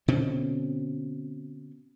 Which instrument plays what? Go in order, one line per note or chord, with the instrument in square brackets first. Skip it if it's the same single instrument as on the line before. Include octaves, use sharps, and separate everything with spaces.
[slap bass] B2 D3 C4 C#4